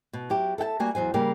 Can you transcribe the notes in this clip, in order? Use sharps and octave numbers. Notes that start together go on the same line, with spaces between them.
B2
F#3 E4 G4
A4 E5 G5 A5
G3 A#3 F#4 G#5
E2 F#3 C5 G#5
C#3 G3 A#3 C#4 G4 A#4